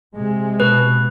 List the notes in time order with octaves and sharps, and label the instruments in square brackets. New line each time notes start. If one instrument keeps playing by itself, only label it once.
[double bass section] C3 G#3
[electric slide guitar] B2 [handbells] B4